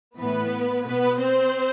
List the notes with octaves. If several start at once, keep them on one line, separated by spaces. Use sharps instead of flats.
A2 E3 B3 B4
B2 B3 B4
C4 C5